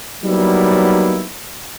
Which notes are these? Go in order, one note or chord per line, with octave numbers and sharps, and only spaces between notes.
F#3 G3 A#3 B3 D#4 E4